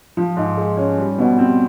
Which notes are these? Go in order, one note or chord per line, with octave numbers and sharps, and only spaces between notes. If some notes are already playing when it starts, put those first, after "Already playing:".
F3
G#2
G#3
C#4
G3
B2
C4